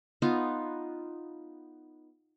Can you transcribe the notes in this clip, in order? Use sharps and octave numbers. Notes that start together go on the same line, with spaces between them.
B3 D#4 F4